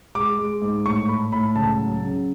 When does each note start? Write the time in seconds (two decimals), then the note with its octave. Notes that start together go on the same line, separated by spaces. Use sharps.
0.15 G#3 D6
0.39 G#3
0.62 G#2
0.86 A2 C#6
1.08 A3 B5
1.32 A2 B5
1.56 C#2 A5
1.79 F#3
2.02 C#3